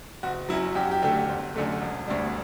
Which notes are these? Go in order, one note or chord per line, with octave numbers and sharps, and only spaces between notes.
F#1 F#4
F#2 F#3 E4
F#2 G4
F#4
G4
D3 A3 G4
G1
F#2 D3 A3
E1
D2 D3 G3